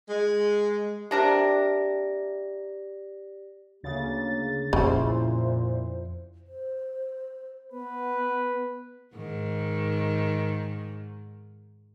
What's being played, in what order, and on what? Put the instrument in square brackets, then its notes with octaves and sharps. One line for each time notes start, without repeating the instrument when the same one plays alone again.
[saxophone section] G#3
[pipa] C3 D4 A#4 [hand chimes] G4 D5 A#6
[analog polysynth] D2 C#3 A6 [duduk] A#3
[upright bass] F2 [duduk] A#2 [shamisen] C#3 [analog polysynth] E4 C5
[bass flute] C5
[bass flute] B3 [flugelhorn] B4
[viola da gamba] G#2 D#3